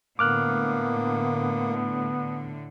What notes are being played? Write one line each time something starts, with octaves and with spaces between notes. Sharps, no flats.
A2 D3 A#3 B3 D6 F6 F#6